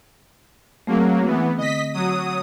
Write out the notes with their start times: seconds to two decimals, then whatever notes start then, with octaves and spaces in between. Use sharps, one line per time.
0.87 F#3 A3 A#3 C4 G#4
1.25 E3 B3
1.58 D3 C4 D#5 B6
1.93 F#3 D#6